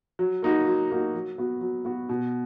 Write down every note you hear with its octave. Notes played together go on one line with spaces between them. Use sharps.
F#3
A#3 D#4 F#4
F#3
A#3 D#4 F#4
F#3
B3 F#4
F#3
B3 F#4
B2